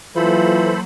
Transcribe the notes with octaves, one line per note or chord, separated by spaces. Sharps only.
E3 F#3 A#3 F4 A4 C5 B5